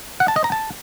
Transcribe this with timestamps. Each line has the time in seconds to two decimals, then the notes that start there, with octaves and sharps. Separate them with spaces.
0.20 F#5
0.28 A5
0.36 D#5
0.44 A#5
0.52 A5